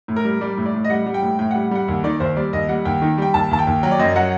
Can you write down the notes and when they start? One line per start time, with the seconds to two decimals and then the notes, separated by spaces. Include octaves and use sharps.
0.08 A2
0.16 A#4
0.25 G3
0.41 G3 D5
0.57 A2
0.66 D5
0.74 A2
0.84 D#5
0.90 G3 F#5
1.06 G3
1.14 G5
1.22 A2
1.39 A2 G5
1.51 G3 F#5
1.71 G3 F#5
1.88 D#2
2.04 D#3 D5
2.20 D#2 C5
2.36 G3 D5
2.53 D#2 D#5
2.69 G3 F#5
2.85 D#2 G5
3.02 D#3
3.18 G3 G5
3.34 D#2 A5
3.51 D#2 A5
3.59 G5
3.67 D#2
3.83 F#3 G5
3.91 D5
3.99 F#2 D#5
4.16 F#3 F#5